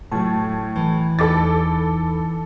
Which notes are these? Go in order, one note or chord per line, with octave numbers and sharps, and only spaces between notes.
A2 F#3 A5
E3
E2 D#4 A4 B5 D6 A6